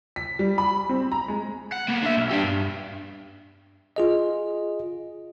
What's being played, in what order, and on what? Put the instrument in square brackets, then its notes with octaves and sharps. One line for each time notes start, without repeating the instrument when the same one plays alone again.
[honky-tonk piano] B6
G3
B5
C4
A#5
G#3
[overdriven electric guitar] F#5
A#3 B3
D4 E5
B1
D4 G4
G2
[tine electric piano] F4 G#4 D#5